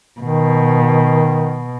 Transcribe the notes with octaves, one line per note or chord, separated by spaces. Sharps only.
B2 D#3